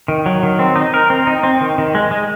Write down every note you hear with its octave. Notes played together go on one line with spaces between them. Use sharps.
D#3
F#3
D#3
C4
D#4
A#4
C4
D#4
C4
D#3
D#3
G#3
G#3